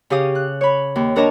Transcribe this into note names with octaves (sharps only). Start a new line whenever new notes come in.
C#3 G4 G#4 F5 D#6
F#6
C#5 B5
D#2
D4 A#4 C#5 D#5 A5 A#5